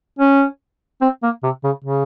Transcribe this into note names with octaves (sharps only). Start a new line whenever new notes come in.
C#4
C4
A#3
C3
C#3
C#3